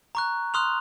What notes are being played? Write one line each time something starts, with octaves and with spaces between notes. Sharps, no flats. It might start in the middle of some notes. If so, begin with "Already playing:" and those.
A#5 C#6 F#6
C6 D#6 F6 F#6 F7